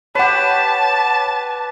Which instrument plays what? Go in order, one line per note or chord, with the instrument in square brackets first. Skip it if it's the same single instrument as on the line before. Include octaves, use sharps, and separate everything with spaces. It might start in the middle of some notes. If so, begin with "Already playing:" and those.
[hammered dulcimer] G4 B4 [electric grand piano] C#5 F#5 [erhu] A5